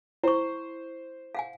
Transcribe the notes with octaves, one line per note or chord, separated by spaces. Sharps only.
E4 C5 C#6
F5 F#5 G#5